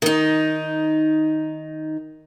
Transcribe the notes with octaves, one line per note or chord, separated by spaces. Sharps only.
D#3 D#4